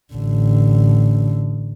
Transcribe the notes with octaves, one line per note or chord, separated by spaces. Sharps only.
A1 D3